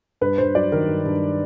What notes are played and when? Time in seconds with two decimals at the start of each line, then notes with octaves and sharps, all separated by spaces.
0.21 G2 B4
0.38 G2 C5
0.55 F#3 D5
0.72 D#3 A#4
0.88 G2
1.06 G2